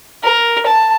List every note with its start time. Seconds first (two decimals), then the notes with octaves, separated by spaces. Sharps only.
0.23 A#4
0.66 A5